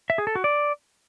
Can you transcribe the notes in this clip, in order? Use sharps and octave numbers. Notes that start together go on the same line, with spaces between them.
E5
G#4
A4
F#4
D5